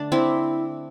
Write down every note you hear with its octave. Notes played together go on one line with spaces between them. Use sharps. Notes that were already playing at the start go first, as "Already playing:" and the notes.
Already playing: D3 A3 D4
C4 E4